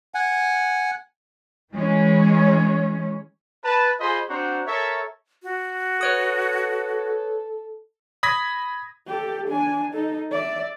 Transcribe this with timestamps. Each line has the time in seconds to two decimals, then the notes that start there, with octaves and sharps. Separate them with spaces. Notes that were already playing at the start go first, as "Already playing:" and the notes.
0.15 F#5 G#5
1.73 E3 G#3 C#4
3.65 B4 A5
4.00 F4 G#4 C5 D#5 B5 C6
4.29 C4 D4 F#4 C5 F#5 A#5
4.67 A4 A#4 C#5 E5
5.43 F#4
6.01 A4 B4 C#5 D#6
8.23 B5 D#6 G#6 A#6 B6
9.07 G4 A4
9.48 D4 G#5
9.93 D#4 A4
10.31 D5 E5